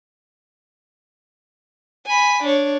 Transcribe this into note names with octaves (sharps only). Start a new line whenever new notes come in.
G#5 B5
D4 C#5